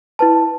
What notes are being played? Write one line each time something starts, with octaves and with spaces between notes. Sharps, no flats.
E4 B4 A5